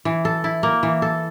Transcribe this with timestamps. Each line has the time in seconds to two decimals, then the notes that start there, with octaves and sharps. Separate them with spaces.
0.05 E3
0.25 A4
0.44 E4
0.63 A#3
0.83 E3
1.02 A4